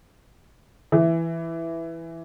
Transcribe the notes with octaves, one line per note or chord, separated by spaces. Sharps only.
E3